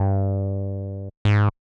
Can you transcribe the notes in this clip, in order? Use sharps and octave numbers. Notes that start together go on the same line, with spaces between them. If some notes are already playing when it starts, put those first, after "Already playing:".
Already playing: G2
G#2